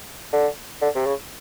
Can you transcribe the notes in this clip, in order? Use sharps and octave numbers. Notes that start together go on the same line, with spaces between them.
D3
D3
C3
C#3